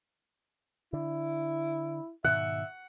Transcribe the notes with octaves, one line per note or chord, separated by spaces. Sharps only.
D3 E4
G#2 B2 D#3 E5 F#5